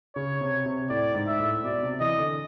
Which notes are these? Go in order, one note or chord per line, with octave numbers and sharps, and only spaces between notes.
C#3 C#5
C3
C3
A2 D5
G#2
E5
A2
B2 D5
C3
E3 D#5
D3